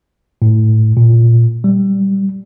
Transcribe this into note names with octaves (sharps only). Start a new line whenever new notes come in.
A2
A#2
G3